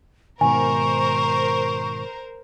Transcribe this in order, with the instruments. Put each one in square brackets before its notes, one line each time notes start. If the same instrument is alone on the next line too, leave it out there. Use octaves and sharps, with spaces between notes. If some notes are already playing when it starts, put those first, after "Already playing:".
[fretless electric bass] G#2 B2 D#3 [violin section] A#4 C5 [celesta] G#5 [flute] C#6